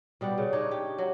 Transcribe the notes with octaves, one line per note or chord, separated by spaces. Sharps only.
B2 G3 G4 F#5
C#3
D4 D#4 C#5
G4
F#3